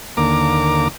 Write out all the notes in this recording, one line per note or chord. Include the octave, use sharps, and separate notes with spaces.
D#2 D3 A#3 A#5 D6